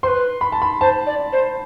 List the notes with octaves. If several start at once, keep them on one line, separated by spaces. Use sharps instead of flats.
B4 C5 C6
B5
A5
B5
C5 A5
D5
C5